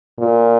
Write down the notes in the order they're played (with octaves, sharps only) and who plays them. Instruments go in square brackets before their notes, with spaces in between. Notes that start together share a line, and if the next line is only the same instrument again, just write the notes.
[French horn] A#2